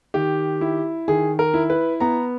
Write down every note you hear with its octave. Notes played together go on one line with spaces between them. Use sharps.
D#3 G4
E4
D#3 G#4
A#4
E4
B4
B3 A#5